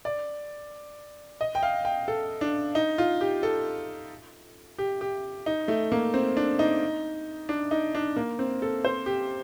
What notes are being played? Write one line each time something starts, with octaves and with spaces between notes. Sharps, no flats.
D5
D#5
G5
F5
G5
A4
D4
D#4
F4
G4
A4
G4
G4
D#4
A3
A#3
C4
D4
D#4
D4
D#4
D4
A#3
C4
A4
C5
G4